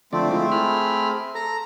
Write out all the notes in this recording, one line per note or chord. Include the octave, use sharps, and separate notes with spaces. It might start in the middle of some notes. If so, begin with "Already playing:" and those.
D3 F3 A3 C4 D5
G#3 E4 F4
G#4 B5 F6
A4 A#5